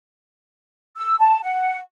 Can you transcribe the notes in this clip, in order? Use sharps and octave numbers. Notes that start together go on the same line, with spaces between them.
E6
A5
F#5